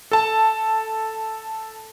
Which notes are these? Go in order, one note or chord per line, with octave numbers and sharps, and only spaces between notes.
A4 A5